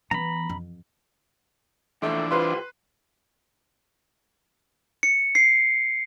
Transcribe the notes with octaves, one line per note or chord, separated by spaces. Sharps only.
E3 B3 A#5 B5
F2
C#2 E3 F3 A3 D4 D5
C2 F4 B4 C5 C6
C#7
C7